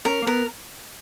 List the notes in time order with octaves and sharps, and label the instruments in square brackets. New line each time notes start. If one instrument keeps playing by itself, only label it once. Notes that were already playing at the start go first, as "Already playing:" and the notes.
[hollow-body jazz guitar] C#4 [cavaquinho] A#4
[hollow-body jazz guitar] A#3
[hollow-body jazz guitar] B3 [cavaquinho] A#4